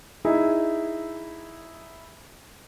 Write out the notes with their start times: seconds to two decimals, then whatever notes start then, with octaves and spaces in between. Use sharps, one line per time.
0.25 D#4 E4 G#4